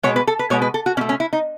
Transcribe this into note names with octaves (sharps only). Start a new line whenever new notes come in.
B2 G#3 B3 C#5
B4
A4
B4
B2 G#3 B3 C#5
B4
A4
F#4
B2 A3 C#4
C#4
E4
D#4